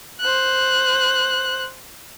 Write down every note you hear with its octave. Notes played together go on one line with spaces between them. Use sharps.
C5 F#6